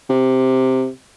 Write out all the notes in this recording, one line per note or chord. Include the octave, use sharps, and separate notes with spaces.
C3